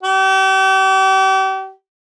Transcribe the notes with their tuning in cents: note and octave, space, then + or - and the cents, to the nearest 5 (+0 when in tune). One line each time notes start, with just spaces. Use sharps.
G4 -40